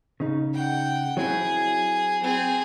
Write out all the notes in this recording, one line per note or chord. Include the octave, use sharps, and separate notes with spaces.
C#3 D#4
F#5 G5
F#3 C4 E4 G#4
C4 G#4